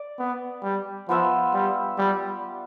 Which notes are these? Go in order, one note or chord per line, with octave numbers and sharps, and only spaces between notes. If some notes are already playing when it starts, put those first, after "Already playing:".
Already playing: D5
B3
G3
F3 B3 F4 B4 E5
G3
G3